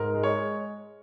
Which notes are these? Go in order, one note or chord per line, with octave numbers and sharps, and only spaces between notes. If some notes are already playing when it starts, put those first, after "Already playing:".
Already playing: G#2 A#4
G#3
C#5
G#3